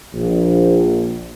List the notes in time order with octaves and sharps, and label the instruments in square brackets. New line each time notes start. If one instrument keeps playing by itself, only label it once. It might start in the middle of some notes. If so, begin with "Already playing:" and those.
[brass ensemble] A#1